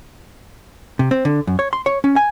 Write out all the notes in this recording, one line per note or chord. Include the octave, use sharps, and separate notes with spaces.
C3
C4
D3
F#2
C#5
C6
C#5
C#4
G#5